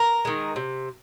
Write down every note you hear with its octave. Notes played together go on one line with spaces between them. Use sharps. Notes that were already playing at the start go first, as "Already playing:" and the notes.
Already playing: A#4
D#3 G#3
C3